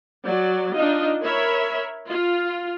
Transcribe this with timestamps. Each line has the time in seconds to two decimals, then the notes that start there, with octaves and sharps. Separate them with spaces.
0.25 F#3 D5
0.74 D4 D#4 F4 D#5
1.22 A#4 C#5 E5 B5
2.09 F4